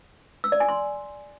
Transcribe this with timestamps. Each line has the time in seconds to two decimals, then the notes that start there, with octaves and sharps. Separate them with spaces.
0.44 E6
0.52 D5
0.60 G#5
0.69 C6